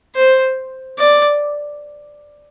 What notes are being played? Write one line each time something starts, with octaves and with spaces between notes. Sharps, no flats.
C5
D5